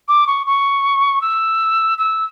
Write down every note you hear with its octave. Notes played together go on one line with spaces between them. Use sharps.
D6
C#6
C#6
E6
E6